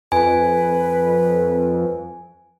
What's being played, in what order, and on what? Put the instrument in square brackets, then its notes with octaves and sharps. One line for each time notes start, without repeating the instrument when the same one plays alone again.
[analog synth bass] F2 [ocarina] B4 [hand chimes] G#5